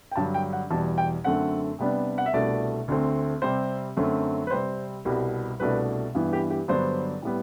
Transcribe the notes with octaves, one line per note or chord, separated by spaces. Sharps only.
G5
G2 D3 F#3 A5
G5
F#5
E2 B2 G3 A5
G5
F#2 D3 A3 C4 F#5
C3 G3 B3 D4
F#5
E5
C2 B2 A3 D4 D5
D2 D3 A3 C4
C3 G3 C4 C5
F#2 D3 F#3 A3 C4
B4
C3 G3 C4 C5
C2 B2 G3
C2 B2 A3 D4 B4
G2 E3 B3
G4
G4
G2 D3 F#3 B3 D4 C5
A2 G3 B3